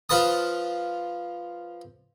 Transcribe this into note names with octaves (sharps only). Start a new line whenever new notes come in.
F3 F4 B4 A5 D#6